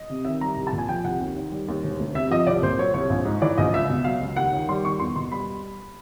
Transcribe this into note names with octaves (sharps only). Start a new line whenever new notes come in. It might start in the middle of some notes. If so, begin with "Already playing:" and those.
Already playing: D#5
C3
D#3 E5
G3 A#5
C2
A5
A#2
G#5
F3 G5
C2 F#5
D#2
D#3
G3
D#2
E1
D2
C3 E5
F3 D#5
C2 D5
A#2 C5
F#3 C#5
C2 C#5
A#1
G#2
E3 D5
A#1 D#5
C#2 E5
B2
F#3 F5
C#2
D#2 F#5
D#3
G3 C6
D#2 C#6
E2 C6
B2 C6
G3 B5